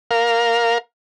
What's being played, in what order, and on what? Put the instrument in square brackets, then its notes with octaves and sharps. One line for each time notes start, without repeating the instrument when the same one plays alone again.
[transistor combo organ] A#4 F5